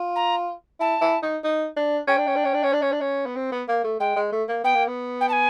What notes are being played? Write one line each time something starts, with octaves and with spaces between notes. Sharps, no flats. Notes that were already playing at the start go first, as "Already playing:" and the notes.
Already playing: F4
A#5
E4 A5
E4
D#4
D#4
D4
C#4 G5
D4
C#4
D4
C#4
D4
C#4
D4
C#4
D4
C#4
B3
C4
B3
A#3
A3
G#3 G5
G#3
A3
A#3
B3 G5
A#3
B3
G5
A5
G#5